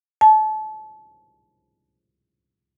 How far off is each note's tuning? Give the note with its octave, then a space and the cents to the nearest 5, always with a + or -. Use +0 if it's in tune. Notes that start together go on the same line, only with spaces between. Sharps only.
A5 -30